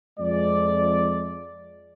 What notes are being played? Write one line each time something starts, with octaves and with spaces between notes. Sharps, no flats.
F2 F3 G#3 D5